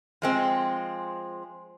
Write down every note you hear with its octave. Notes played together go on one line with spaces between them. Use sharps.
F3 G#3 C4